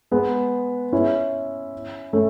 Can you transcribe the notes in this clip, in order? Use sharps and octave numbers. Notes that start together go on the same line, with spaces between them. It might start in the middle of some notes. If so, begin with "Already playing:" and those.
G#3 B3
C#4 E4
A3 C#4